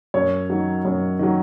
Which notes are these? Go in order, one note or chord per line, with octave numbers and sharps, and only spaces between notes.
F#2 C#5
D#3 F#3
F#2
D#3 F#3